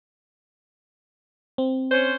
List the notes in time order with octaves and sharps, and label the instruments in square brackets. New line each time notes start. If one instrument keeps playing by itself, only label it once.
[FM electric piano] C4
[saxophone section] C#4 C5